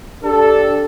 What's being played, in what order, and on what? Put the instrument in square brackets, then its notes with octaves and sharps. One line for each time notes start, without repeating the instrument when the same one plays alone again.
[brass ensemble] D4 G4 A4